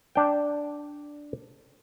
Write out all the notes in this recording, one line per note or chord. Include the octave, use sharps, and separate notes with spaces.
D4 G5